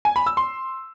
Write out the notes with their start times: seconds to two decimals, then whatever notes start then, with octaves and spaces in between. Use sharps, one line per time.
0.05 G#5
0.16 B5
0.26 E6
0.37 C6